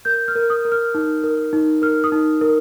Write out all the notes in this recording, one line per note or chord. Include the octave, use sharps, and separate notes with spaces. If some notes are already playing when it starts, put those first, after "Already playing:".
A#4 G6
F6
A#4
D#6
A#4
F6
D#4
A#4
D#4
A#4 F6
D#6
D#4
A#4